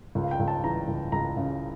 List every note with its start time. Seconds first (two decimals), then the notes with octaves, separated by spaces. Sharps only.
0.15 C#2
0.23 F5
0.31 G5
0.40 C#2
0.48 A5
0.64 E3 A#5
0.88 C#2
1.12 C#2 A#5
1.37 C#3